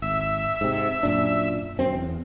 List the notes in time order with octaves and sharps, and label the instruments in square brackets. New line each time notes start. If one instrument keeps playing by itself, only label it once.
[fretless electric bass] G#1 [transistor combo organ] E5
[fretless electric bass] G#2 C3
F#2 A#2 D4
D#1 F#2 C4
E2